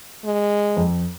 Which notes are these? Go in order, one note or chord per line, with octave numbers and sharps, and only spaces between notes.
G#3
F2